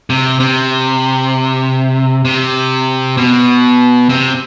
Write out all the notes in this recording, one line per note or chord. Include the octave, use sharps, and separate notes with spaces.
C3
C3
C3
B2
C3